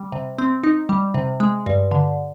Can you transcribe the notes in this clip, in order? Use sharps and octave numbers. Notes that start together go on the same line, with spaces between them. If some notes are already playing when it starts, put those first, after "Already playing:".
Already playing: G3
C3
C4
D#4
G3
C3
G#3
G2
D3